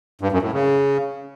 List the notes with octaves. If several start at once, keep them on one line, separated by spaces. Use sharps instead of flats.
G2
F#2
A2
C#3